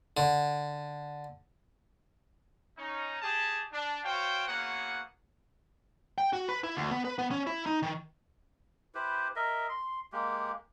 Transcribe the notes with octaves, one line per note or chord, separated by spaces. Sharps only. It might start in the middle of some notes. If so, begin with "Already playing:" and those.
D3
C#4 D#4
G4 G#4 A5
D4
F#4 C5 C#5 F5 G5
A#3 B3 C#4 F#4 G#4 F#5
G5
F#4
B4
E4
D2
B3
B4
B3
C#4
E4
D#4
D#3
E4 G4 B4 C5
A#4 D#5 E5
C6
G#3 A#3 G4